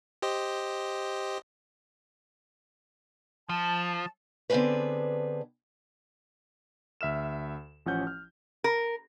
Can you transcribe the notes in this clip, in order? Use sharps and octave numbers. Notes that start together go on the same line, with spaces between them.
G4 C5 D#5
F3 A5
D3 B3 C4 D4 G#4 B4
D2 E5 F6 E7
A1 F3 C#4 F#5 G6
F6
A#4